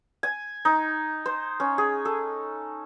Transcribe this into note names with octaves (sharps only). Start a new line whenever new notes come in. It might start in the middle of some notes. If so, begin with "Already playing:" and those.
G#5
D#4
C5
C#4
G#4
A4